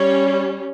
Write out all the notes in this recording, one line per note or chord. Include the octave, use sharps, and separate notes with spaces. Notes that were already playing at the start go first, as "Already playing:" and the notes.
Already playing: G3 C#4 C#5